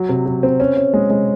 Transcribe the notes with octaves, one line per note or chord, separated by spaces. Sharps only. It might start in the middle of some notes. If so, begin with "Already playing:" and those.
Already playing: F#3
C3
F#3
C4
C#4
C#4
G#3
G#3